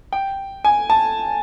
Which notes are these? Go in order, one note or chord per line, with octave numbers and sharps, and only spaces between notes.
G5
G#5
A5